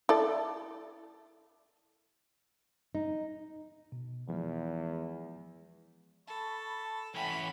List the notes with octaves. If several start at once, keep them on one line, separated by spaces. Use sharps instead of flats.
E4 A4 D5
D#4
B2
E2 F3 G#3
A4 A5 B5 C#6
E3 C#4 E5 F#5 G5 B5